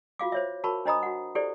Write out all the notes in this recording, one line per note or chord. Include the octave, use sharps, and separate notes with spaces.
F4 F#4 F5 D6
C5 C#5 E5
F#4 A#4 A5 B5 C#6
D4 C5 D#5 A#5 B5 D#6
F#4 F#5
E4 G4 A4 C5 D5